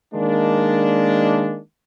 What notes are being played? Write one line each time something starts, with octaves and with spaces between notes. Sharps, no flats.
D#3 G#3 A#3 D4